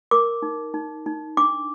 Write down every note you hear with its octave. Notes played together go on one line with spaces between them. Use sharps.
A#4 D6
D#4
D#4
D#4
D4 D6